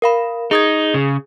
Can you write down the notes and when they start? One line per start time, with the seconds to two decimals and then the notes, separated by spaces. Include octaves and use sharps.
0.02 A#4 F5 B5
0.51 D#4 G#4 D#6 G#6
0.94 C#3